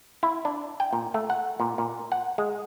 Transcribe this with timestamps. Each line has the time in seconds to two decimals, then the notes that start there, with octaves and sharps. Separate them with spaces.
0.23 E4
0.45 D4
0.80 G5
0.93 A#2
1.14 A3
1.30 F#5
1.60 A#2
1.78 A#2
2.12 F#5
2.38 G#3